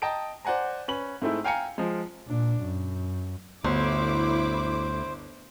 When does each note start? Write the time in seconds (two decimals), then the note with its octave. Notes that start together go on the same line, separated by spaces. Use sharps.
0.02 D#5 G5 A5 A#5 D#6 D7
0.45 C5 D5 F#5 G#5 A#5
0.88 C#4 B4 F#7
1.22 G#2 G#3 A3 C4 E4
1.44 F5 G5 G#5 A#5 C#7
1.78 F3 G#3
2.28 A#2 D4
2.62 F#2
3.64 G1 D2 E4 C5 D6